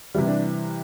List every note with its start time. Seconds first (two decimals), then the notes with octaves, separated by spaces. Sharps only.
0.14 C3 E3 G3 E4
0.27 D4